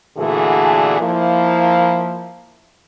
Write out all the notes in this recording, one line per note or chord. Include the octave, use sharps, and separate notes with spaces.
A#2 D3 E3 A3 F#4 G#4
F3 A#3 E4